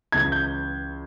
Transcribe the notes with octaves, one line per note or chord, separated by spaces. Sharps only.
C#2 C#3 E3 G#6
G6